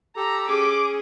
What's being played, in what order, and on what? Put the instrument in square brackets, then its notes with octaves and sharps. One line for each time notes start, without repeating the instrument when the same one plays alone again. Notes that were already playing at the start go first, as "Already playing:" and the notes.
[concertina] G4 A4 [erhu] A#5
[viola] C#4 G#4 [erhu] D6